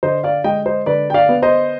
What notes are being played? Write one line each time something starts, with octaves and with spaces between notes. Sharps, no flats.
D3 C5 D#5
D5 F5
G#3 D#5 G5
C5 D#5
D3 B4 D5
G5
D5 F5
B3
C5 D#5